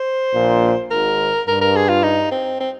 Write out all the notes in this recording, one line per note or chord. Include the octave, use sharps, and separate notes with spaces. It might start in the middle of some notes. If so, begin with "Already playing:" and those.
Already playing: C5
A#1 A#2
G#1 G#2 A#4
G2 A#4
A#4
G#4
F4
D#4
C4
C4